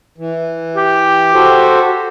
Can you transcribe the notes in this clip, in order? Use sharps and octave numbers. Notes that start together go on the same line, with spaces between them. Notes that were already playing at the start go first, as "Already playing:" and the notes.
E3
G4
F#4 A4 C5